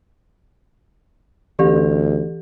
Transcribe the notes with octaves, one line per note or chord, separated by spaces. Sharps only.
D2 E3 G4 A4